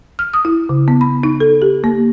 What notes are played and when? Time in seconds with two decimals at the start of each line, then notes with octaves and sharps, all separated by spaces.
0.19 F6
0.34 D#6
0.45 E4
0.69 C#3
0.88 B3
1.01 B5
1.23 D#4
1.40 A4
1.62 G4
1.84 A#3